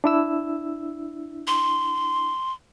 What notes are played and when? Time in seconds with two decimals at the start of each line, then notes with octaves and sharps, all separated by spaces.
0.04 D4 E4 E6
1.47 C6